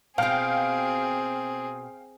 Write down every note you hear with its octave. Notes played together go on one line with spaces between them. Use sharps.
B2 C4 F4 G#4 F5 G5 F6